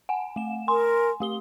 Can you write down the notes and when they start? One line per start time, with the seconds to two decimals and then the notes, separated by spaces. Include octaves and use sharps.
0.09 F#5 G#5
0.36 A3 E7
0.68 A#4 G#5 C6
1.20 A3 G4 G7